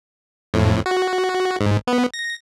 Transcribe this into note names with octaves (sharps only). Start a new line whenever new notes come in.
F2 A2
F#4
G#2
B3
A#6